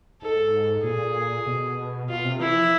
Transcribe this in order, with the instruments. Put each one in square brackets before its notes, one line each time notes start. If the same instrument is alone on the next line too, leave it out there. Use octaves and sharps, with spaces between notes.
[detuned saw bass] G#2 [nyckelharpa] A4
[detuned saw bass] A#2 [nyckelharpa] G#4
[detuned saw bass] B2
[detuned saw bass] B2 [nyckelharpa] F4
[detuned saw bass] C3
[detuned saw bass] E3 [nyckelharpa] E4
[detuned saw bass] F3